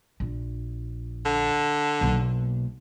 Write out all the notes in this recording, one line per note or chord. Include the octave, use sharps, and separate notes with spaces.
A#1
D3
B1 A#3